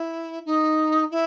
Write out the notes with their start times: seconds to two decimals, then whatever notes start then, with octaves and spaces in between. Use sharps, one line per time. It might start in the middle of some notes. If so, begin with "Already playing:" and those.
Already playing: E4
0.45 D#4
1.11 E4